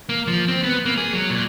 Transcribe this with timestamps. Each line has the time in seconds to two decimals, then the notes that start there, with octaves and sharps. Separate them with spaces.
0.09 A#3
0.27 F3
0.48 C4
0.64 B3
0.85 A#3
0.97 G#4
1.13 F#3
1.30 A#2